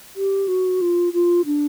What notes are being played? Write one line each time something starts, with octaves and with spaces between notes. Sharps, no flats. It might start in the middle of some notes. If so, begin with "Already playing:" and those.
G4
F#4
F4
F4
D4